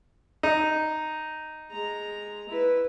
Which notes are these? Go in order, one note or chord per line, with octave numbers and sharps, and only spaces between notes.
D#4
G#3 A#5
E4 B4